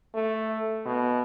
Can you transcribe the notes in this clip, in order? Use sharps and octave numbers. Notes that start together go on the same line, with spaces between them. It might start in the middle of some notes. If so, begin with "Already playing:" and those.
A3
B2